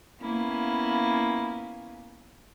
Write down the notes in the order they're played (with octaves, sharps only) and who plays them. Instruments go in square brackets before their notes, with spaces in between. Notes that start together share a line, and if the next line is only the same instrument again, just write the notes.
[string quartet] A#3 B3 C#4 E4 F4